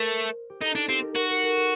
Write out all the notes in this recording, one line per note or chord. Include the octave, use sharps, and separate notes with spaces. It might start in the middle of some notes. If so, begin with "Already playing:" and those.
Already playing: A3 A#4 C5
G4
D#4 A4
D4 D#4
C4 G4
A#4
F#4 A#4
A#4
A4
G4